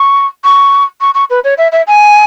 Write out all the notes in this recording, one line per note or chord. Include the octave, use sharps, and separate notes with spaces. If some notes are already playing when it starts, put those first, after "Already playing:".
Already playing: C#6
C#6
C#6
C#6
B4
C#5
E5
E5
G#5